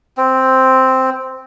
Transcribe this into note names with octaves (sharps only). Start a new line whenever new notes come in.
C4